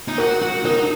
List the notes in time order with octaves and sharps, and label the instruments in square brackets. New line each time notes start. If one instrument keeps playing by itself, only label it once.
[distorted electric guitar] D#4
[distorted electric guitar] F#4 [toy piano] A#4
[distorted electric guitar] F#4
[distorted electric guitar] D#4 [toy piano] A#4